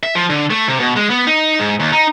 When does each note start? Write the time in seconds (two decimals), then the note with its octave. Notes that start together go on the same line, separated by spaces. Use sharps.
0.03 E5
0.15 F3
0.30 D3
0.50 A3
0.68 C3
0.80 B2
0.96 G#3
1.10 B3
1.27 D#4
1.59 G#2
1.80 D#2
1.92 D#4